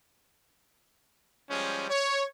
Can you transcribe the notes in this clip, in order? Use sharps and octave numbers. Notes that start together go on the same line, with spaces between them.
F3 G3 G#3 C#4
C#5